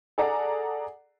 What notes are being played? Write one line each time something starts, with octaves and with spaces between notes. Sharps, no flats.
G#4 A4 D5 F#5 A#5